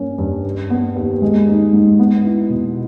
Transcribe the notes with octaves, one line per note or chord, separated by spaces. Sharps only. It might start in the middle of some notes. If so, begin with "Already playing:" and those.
Already playing: G2 A#3 C#4
G2
G3
B3
D#2
G#3
D#4
G#2
B3
E4
B2